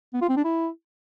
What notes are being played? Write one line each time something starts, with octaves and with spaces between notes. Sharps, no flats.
B3
F4
C4
D4
E4